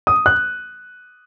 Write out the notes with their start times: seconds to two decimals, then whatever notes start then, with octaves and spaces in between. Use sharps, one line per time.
0.07 D#6
0.26 F#6